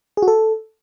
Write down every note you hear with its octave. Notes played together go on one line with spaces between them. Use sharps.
G#4
F#4
A4